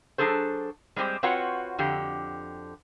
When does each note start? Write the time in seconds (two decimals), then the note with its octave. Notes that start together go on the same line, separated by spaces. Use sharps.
0.18 F#3 D4 G#4 A4 C5
0.96 G3 G#3 C4 G4 C5
1.23 C4 F4 F#4 B4 C#5 F#5
1.78 F2 D3 G4